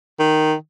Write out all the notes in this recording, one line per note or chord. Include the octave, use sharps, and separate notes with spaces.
D#3